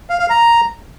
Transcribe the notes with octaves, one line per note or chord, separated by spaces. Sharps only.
F5
F5
A#5